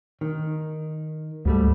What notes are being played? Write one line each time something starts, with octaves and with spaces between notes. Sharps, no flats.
D#3
D2 G#2 G3 A3